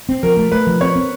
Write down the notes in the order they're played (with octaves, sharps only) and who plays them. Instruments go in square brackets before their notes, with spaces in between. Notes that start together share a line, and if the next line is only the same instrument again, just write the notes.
[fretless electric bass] C4
[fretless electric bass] F3 [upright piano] A#4
[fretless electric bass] A3
[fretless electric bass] A3 [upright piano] B4
[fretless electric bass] F3
[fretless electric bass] C4 [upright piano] C#5
[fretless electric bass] C4